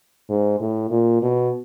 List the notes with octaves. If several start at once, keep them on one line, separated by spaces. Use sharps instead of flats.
G#2
A2
A#2
B2